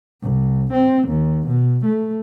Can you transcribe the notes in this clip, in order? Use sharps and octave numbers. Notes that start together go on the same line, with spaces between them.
C2
C4
D#2
B2
A3